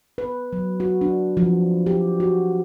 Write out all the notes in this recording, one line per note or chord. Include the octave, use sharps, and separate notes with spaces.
B4
F#3
F#4
D4
F3
G4
F#4